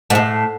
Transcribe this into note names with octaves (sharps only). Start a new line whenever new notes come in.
G#2
A2